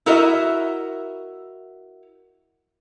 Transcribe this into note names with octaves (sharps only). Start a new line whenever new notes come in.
E4 F#4 A#4 D#5 E5